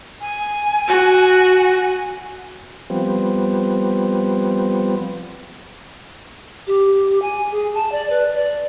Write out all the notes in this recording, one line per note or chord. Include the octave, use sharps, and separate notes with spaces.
G#5
F#4
F3 G3 B3 C4
G4
G#5
G#4
A5
D5
B4
D5